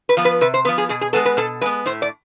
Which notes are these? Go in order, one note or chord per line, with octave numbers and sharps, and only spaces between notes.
B4
F3 B3
B4
C3 B4
C5
F3 B3 B4
G#4
B2 G#4
G#4
G#3 B3 A4
B4
B2 A4
G#3 B3 B4
A2 C5
D5